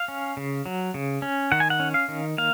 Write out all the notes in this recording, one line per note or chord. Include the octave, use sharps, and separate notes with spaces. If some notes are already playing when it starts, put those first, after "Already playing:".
Already playing: F5
C#4
C#3
F#3
C#3
C#4
D#3 F#5
G#5
F#5
C#4
F5
D#3
A#3 F5